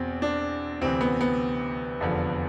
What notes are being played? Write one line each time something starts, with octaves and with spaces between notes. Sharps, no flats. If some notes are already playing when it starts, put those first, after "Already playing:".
Already playing: E2 B2 C4
D4
D2 C3 E3 C4
B3
B3
F1 E2 D3 F3